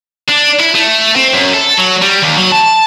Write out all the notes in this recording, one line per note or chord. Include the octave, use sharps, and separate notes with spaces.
D4
E4
A3
C4
F#2
A4
F#3
G3
D#2
F#3
A5